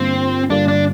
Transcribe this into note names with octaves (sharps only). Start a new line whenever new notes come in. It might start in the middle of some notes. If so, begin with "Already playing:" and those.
Already playing: G2 D3 G3 A#3 C4 F4
G2 D3 G3 A#3 D4 F4
D4